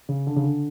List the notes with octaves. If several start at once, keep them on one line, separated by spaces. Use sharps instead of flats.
C#3
D3
C#3
D3